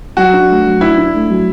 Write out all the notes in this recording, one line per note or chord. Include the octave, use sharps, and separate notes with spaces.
F#3 F#4
D4
A3
F#3
D4 E4
D4
A3
F#3